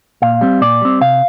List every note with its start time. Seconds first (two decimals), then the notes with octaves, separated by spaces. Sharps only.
0.22 A#2 F5
0.41 G3 C4
0.61 A#2 D5
0.81 G3 C4
1.01 C3 F5